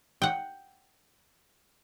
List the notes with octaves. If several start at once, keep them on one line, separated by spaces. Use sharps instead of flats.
F#5 G5